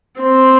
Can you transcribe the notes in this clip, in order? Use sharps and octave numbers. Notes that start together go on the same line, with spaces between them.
C4